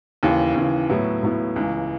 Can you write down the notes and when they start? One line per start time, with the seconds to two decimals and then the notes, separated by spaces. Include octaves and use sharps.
0.23 D#2 C#3 E3
0.55 D#2 C#3 E3
0.90 A2 F#3 B3 E4
1.23 A2 F#3 B3 E4
1.56 C#2 C#3 E3